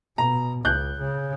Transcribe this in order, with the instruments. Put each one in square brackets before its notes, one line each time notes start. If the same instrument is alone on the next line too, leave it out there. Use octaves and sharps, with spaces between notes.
[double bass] B2 [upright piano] A#5
[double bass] C#2 [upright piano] F#6 G6
[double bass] C#3